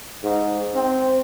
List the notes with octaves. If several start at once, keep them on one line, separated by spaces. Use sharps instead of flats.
G#2
C4